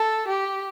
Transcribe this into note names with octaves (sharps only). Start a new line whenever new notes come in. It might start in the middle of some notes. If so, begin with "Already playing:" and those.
Already playing: A4
G4